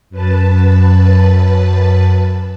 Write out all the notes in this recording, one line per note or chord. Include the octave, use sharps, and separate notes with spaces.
F#2 B4 A5